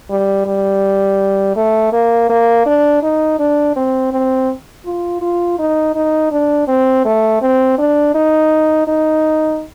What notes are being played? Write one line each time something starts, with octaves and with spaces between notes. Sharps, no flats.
G3
G3
A3
A#3
A#3
D4
D#4
D4
C4
C4
F4
F4
D#4
D#4
D4
C4
A3
C4
D4
D#4
D#4